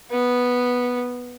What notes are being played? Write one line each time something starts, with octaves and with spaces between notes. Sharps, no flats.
B3